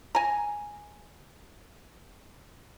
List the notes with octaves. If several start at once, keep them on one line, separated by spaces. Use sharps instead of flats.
G#5 A#5